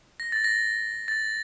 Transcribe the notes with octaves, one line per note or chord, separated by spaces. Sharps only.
A#6
A6
A#6
A6